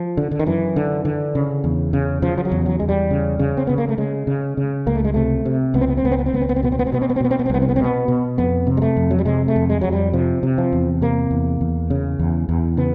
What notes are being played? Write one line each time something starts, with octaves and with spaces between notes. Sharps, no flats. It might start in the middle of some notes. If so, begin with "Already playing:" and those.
Already playing: F3
D3
D3
D#3
F#2 E3
D3
D3
C#3
E2
C#3
C#3 F3
F3
F#3
E2
F#3
E2 G#3
G3
C#3
C#3
C4
C#3 B3
A#3
A3
C#3 G#3
C#3
C#3
C#2 A#3
A3
G#3
C3 A3
C3
C#2 B3
C4
B3
C4
C#2 B3
C4
B3
C4
C#2 B3
C4
B3
C4
B2 B3
C4
B3
C4
B2 B3
C4
B3
C4
B2 B3
C4
B3
C4
C2 B3
C4
B3
C4
B2 B3
B2
F2 B3
C3
G#3
A3
F2
F#3
G3
C3 G#3
A3
F2
G#3
F2 F#3
G3
C3 F3
C3
F3
E2
C3 A#3
E2
E2
C#3
E2
E2
C#3 B3